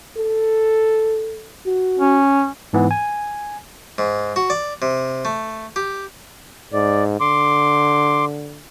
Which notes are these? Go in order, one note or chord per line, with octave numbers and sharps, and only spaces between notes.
A4
F#4
C#4
G#2 E3 B3
G#5
G#2
F#4
D5
C3
A3
G4
G#2 D5
D3 C6 D6